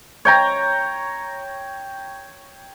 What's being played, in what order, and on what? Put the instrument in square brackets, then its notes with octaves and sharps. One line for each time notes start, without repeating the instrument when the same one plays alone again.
[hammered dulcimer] C#5 G5 A#5